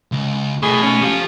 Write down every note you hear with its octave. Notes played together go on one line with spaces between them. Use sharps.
C#2
B2 A3 D#4 G#4
C#4
F3 F4 G4 A4